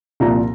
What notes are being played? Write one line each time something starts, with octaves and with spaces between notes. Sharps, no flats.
C2 A#2 F3 A#5